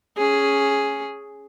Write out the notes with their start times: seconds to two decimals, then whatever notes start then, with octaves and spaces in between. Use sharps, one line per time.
0.17 C#4 G#4